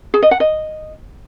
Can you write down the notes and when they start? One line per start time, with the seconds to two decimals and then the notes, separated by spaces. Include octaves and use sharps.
0.14 G#4
0.22 D#5
0.31 F#5
0.40 D#5